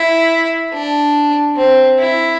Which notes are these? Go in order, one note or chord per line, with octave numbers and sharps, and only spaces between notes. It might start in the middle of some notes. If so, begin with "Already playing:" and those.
Already playing: E4
D4
C4
E4